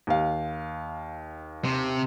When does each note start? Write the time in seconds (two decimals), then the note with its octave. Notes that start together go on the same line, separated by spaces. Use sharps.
0.07 D#2 F5
1.65 C3